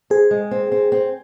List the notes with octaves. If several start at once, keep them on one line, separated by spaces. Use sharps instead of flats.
C4 G#4
G#3
C4
C4
C4